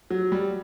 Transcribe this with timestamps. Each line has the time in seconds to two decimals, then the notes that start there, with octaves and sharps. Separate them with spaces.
0.11 F#3
0.32 G3